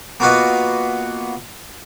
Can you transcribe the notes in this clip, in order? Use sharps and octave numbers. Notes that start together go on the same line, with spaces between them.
A#3 B3 F4 F#4 B4 D#5